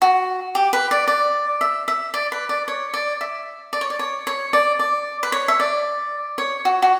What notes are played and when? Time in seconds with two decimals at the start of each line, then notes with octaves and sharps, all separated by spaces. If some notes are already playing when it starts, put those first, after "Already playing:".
0.02 F#4
0.55 G4
0.73 B4
0.91 D5
1.08 D5
1.61 E5
1.88 E5
2.14 D5
2.32 B4
2.49 D5
2.68 C#5
2.94 D5
3.21 E5
3.73 D5
3.81 C#5
3.90 D5
3.99 C#5
4.27 C#5
4.53 D5
4.79 D5
5.23 B4
5.32 C#5
5.48 E5
5.60 D5
6.38 C#5
6.65 F#4
6.82 F#4